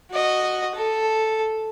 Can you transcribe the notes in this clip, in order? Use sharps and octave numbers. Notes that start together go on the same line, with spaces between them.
F#4 D#5
A4